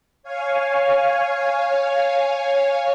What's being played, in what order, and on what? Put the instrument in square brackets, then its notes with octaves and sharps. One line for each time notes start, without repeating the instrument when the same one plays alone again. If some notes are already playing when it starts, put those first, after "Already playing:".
[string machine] C#5 F5 G#5